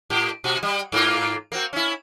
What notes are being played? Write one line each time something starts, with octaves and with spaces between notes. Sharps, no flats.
A2 G4
B2 F#4
G3
G#2 A#3 F4
A#3 C4 F#4
C#4 E4